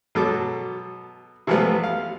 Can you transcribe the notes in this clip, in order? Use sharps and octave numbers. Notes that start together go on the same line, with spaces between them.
B2 F#3 A4 D6
C3 E3 F3 G3 A3 B3
F5